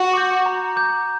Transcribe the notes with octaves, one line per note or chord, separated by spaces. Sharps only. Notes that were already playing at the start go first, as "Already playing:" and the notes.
Already playing: F#4
D6 G6
A#5
D6 G6